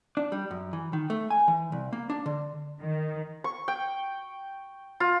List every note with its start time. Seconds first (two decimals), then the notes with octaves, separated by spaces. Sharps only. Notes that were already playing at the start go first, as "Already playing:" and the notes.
0.17 D4
0.32 G3
0.51 F#2
0.73 E3
0.93 D#3
1.10 A3
1.30 G#5
1.48 E3
1.72 C2
1.93 A#3
2.10 D4
2.26 D3
2.81 D#3
3.44 C#6
3.68 G5
5.00 F4